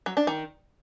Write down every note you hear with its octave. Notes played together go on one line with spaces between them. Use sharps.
F#3
D4
D#3